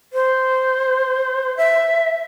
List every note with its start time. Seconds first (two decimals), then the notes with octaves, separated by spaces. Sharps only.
0.13 C5
1.57 E5